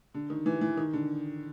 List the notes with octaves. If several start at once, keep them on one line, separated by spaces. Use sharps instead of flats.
D3
D#3
E3
E3
D#3
D3